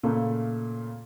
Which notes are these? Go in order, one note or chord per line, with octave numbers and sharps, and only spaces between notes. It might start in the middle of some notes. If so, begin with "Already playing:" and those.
A#2 C#3 A3 A#3